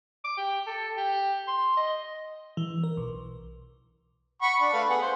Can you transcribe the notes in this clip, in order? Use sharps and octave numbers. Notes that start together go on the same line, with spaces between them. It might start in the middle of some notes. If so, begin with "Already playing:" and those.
D6
G4
A4
G4
C6
D#5
E3
A#4
B1
F#5 B5 C#6
D4
A3 B4 F5
B3 G#4 F#5
C5